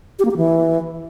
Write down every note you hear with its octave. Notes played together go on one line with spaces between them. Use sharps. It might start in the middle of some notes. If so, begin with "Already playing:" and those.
G4
A#3
G4
E3